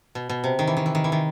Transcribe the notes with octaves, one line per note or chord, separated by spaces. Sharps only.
B2
B2
C3
D#3
E3
D#3
E3
D#3
E3
D#3